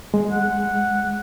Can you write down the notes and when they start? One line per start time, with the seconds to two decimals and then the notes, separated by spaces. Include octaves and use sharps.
0.14 G#3
0.32 F#5